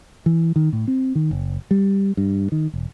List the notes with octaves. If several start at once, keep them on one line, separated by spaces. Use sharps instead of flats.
E3
D#3
A2
C4
D#3
F#1
G3
G2
D#3
E1